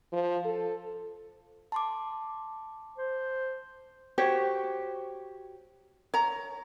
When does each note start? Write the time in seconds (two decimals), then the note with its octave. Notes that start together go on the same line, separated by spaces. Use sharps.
0.13 F3
0.45 A4
1.72 A5 C6 D6
2.98 C5
4.18 F#4 G4 C5 C#5
6.14 C#5 A#5